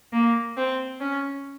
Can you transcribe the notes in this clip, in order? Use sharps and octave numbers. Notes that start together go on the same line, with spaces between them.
A#3
C4
C#4